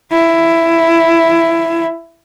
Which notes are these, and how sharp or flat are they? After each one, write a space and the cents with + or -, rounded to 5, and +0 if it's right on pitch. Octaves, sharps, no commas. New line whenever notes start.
E4 +10